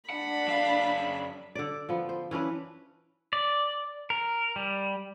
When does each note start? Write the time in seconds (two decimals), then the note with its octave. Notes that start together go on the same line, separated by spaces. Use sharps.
0.10 D4 F#5 B5
0.48 F#2 F5
1.55 D3 D5
1.89 F3 B3
2.09 C5
2.31 E3 C#4 D4 B4
3.33 D5
4.10 A#4
4.56 G3